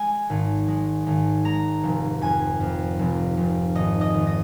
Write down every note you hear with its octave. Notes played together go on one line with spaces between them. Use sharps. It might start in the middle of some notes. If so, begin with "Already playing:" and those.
Already playing: G#3 G#5
G#1
G#3
G#1
G#3 A#5
F1
F2 G#5
F2
F1
F1
G#1 D#5
D#5
G#1
D#5